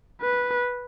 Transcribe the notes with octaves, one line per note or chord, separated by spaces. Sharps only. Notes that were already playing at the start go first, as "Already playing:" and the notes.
B4